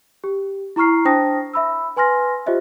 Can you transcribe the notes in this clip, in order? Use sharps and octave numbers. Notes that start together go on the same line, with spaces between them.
G4
E4 A#5 C#6 F6 C7
D4 C5 G5 A5 D#6 A#6
E5 B5 E6
B4 G#5 C6 F6 A#6
F4 G4 C5 D#5 E5